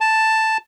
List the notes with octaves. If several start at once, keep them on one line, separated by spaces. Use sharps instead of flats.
A5